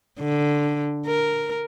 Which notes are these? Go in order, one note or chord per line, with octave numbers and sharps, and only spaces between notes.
D3
A#4